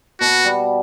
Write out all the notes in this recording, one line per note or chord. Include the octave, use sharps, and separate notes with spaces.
B2 F#4
G3